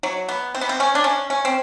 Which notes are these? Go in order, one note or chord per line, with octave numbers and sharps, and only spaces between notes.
F#3
B3
C4
B3
C4
C#4
D4
C#4
C#4
C4